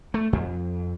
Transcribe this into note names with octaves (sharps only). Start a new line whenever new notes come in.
A3
F2